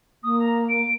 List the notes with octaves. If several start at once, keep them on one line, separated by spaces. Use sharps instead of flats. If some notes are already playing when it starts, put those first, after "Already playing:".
A#3 D#6
A#5
D7